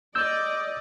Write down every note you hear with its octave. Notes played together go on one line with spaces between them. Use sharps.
D5 D#5 E6 G6